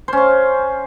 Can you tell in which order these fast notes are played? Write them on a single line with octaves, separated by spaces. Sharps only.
C5 C#4 F5